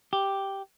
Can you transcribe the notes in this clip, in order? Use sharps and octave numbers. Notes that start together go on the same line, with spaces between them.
G4